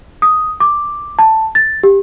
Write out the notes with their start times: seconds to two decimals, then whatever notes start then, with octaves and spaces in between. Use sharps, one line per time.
0.22 D#6
0.60 D6
1.19 A5
1.55 A6
1.83 G4